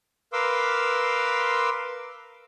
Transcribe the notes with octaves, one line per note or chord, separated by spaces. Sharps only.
A#4 B4 F5 C6 D6 E6